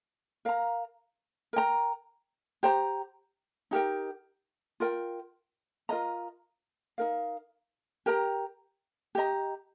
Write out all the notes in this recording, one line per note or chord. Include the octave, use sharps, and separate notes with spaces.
A#4 F5 A#5
A#4 G5 A#5
G4 C5 G5 A#5
D#4 G4 A#4 G5
F4 A#4 G5
F4 A#4 D#5 A#5
D#4 A#4 F5
G4 A#4 G5 A#5
G4 D#5 A#5